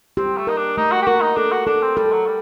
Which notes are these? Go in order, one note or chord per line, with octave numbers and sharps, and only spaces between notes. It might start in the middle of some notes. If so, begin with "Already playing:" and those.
C4 G4
A3
D#4 A#4
D4
A3 D#4
F#4
G4
F#4 A#4
D#4
D4 A4
F#4
D4 A4
C4
G3 A4
F#3
G3